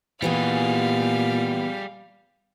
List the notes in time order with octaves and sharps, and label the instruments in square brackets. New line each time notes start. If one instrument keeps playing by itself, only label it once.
[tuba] A#2 [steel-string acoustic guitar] E3 B3 G4 [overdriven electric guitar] G3 G#4 [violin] F5